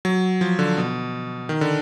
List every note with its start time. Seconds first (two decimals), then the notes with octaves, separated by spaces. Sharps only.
0.05 F#3
0.41 F3
0.59 D3
0.77 B2
1.49 D#3
1.61 D3